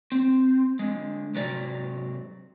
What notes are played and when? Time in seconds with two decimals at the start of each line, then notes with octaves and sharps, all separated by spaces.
0.12 C4
0.79 D3 G#3
1.35 G#2 C3 F#3 D5 A#5